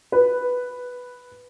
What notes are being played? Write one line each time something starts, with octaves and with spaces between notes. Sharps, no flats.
B4